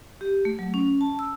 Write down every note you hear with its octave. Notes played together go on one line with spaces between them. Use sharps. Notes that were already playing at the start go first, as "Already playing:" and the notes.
G4
A3
F#3
C#4
A5
E6